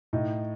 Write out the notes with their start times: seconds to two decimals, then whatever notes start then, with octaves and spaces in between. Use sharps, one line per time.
0.13 A2 D#4